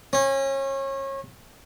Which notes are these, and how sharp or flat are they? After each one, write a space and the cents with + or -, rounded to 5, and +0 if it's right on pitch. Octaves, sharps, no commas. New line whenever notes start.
C#4 -30